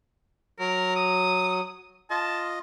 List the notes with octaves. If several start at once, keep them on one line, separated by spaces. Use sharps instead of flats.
F#3 A#4
D#6
F4 D#5 A5